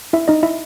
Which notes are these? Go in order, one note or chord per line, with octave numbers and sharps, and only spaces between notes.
E4 E5
D#4 D#5
E4 E5